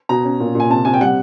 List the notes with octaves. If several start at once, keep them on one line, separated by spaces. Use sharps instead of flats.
B2 A#5
C#4
A#2
A#2 G#5
C3 A5
C3 G#5
G5
G3 F#5